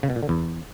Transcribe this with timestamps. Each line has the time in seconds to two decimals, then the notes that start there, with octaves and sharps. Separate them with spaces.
0.03 C#3
0.10 B2
0.16 A#2
0.23 D3
0.29 E2